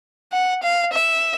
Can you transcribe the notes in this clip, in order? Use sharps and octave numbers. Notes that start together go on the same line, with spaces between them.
F#5
F5
E5